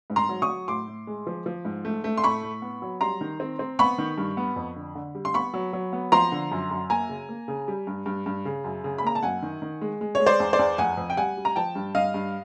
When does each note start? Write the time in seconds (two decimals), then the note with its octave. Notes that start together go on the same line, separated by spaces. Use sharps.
0.10 G#2
0.16 A#5 C6
0.29 F#3
0.42 C#6 D#6
0.48 F#3
0.68 A2 C6 D6
0.88 A2
1.07 G#3
1.27 F3
1.46 F3
1.65 G#2
1.85 A3
2.04 A3
2.17 C6
2.24 A2 B5 C#6
2.43 A2
2.62 B3
2.82 F#3
3.01 G3 A#5 C6
3.21 D#3
3.40 C4
3.59 C4
3.79 B3 B5 C#6
3.98 D#3
4.18 G2
4.37 B3
4.56 F2
4.76 D3
4.95 D3
5.15 G3
5.25 C6
5.34 B3 B5 C#6
5.54 F#3
5.73 F#3
5.93 B3
6.12 F3 A#5 C6
6.32 D3
6.51 F#2
6.71 F#2
6.90 A#3 G#5 A#5
7.09 C#3
7.29 A#3
7.48 C#3
7.68 G3
7.87 G2
8.06 G2
8.26 G2
8.45 C#3
8.64 F#2
8.84 C#3
8.98 B5
9.03 A#3 A#5
9.15 A5
9.23 F#2 F#5 G#5
9.42 D#3
9.62 D#3
9.81 G#3
10.01 G#3
10.15 C#5
10.20 G#3
10.26 C5 D5
10.40 E2
10.53 C5 D5
10.59 E2
10.78 F2 F#5 G#5
10.97 F2
11.10 G5
11.17 G3 F#5 G#5
11.37 G3
11.45 A#5
11.56 F3 G5 A5
11.75 G2
11.95 G2 D#5 F5
12.14 G2